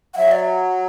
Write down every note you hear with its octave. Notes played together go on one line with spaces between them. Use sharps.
F#5
F#3 E5
D5
E5